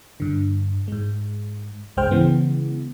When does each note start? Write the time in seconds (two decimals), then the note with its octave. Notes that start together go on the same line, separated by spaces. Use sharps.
0.20 G2 D3
0.88 G#2 G#3
1.97 C2 G2 G#3 C5 G5 F6
2.11 C#3 E3 G#3 B3